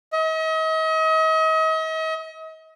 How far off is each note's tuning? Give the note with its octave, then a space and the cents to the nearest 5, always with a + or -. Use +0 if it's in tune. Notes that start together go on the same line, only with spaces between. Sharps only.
D#5 +40